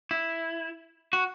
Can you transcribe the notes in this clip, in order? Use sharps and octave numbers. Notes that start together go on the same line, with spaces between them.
E4
F#4